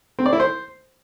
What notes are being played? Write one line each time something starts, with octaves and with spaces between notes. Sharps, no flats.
C4
D5
E4
C5